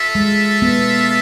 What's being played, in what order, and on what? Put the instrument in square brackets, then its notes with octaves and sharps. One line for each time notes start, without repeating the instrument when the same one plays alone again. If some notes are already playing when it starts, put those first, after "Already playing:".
Already playing: [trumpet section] F4 A4 E5
[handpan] G#3
B3